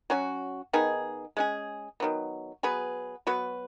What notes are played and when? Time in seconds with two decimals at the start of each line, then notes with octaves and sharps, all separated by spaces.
0.10 F#3 C#4 F#4
0.73 D#3 B3 D#4 G#4
1.37 G#3 C#4 G#4
2.00 D#3 F#3 B3
2.63 F#3 B3 G#4 B4
3.27 F#3 B3 F#4 B4